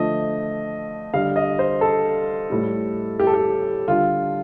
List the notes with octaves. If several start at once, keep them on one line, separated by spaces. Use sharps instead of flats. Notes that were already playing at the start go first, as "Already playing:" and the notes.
Already playing: D3 F3 A3 D#5
D3 G3 F5
D#5
C5
A4
A2 G3
G4
A4
G4
D3 G3 F4